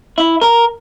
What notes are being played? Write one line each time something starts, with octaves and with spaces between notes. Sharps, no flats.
E4
A#4